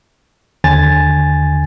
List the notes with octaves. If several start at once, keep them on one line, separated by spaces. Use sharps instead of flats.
D#2 D3 G#5 A6